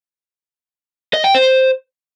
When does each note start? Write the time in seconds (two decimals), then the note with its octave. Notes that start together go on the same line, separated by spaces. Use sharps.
1.14 D#5
1.24 G5
1.35 C5